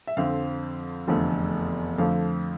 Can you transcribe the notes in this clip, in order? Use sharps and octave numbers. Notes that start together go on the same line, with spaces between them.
E5
F2 D3 F3 C4 F5
F1 E2 D3 F3 A3
F2 D3 F3 A3 F5